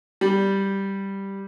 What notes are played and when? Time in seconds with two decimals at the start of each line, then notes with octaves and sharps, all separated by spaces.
0.21 G3